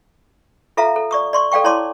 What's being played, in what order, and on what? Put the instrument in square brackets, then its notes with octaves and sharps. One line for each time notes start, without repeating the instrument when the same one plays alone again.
[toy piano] F4 A4 E5 F5 A#5
A4
D5 C#6 D#6
D5 C6 C#6
A4 D5 F5 G5 C#6
E4 C#5 D5 A5 C6 D6